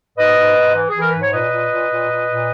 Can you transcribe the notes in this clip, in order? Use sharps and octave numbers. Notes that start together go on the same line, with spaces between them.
G#2 B4 D#5
G#2
G#2
E3
G#4
E3
A#4
G#2 B4
C#5
A#2 B4 D#5
A#2
A#2
A#2
A#2
A#2